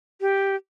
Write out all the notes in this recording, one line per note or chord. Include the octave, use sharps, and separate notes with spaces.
G4